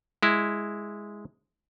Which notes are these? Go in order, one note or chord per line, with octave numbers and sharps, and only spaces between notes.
G#3 E4